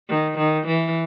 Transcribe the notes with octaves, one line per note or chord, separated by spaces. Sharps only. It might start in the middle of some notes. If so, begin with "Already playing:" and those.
D#3
D#3
E3